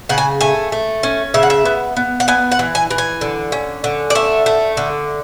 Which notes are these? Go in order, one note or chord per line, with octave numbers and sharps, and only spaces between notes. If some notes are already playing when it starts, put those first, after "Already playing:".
C#3 F#5
G#5
A3 G#5
A3
C#4
C#3 E5
F#5
E5
B3
B3
F#5
B3 G#5
F#5
E3
G#5
E3
G#5
D3
C#4
D3
D5
A3 E5
A3
D3